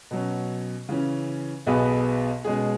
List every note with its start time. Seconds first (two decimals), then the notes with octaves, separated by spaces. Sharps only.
0.11 B2 F#3 C#4
0.89 C#3 E3 C#4
1.66 B1 B2 B3 G#4 B4
2.44 B2 G#3 C#4 G#4